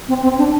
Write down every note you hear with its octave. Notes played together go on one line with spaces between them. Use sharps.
C4
C4
D4